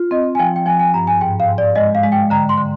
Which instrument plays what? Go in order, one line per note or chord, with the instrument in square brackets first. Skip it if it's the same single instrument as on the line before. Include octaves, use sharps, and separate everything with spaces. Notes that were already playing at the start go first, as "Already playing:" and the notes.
Already playing: [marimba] F4
[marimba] C4 [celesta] D#5
[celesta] G#5
[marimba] F3 [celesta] G5
[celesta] G5
[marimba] F3 [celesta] G#5
[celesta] G#5
[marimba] G2 [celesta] A#5
[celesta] G#5
[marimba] G#2 [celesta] G5
[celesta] F5
[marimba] G#2
[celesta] D5
[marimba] G#3 [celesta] D#5
[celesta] F5
[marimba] G#3
[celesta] G5
[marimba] D3 [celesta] A#5
[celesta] C6
[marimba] D3